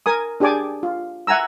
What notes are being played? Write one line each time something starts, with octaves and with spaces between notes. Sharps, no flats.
A#4 G#5 D#6
D4 G4 G#4 D5 G#5 D6
F4
E5 F#5 G#5 A#5 E6